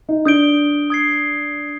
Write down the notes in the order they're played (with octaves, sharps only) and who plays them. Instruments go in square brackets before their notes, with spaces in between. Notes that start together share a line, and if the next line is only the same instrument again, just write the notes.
[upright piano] D#4
[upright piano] D4 [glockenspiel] D#6 G6 D7 G7
[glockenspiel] D#6 G#6 C7